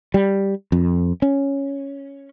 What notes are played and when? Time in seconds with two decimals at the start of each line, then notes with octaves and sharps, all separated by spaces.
0.14 G3
0.72 F2
1.22 C#4